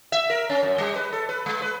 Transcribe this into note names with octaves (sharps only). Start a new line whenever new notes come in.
E5
A#4
C#4
F#2
G3
B4
A4
B4
G#3
B4